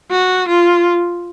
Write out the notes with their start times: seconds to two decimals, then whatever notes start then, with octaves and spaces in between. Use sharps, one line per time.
0.11 F#4
0.48 F4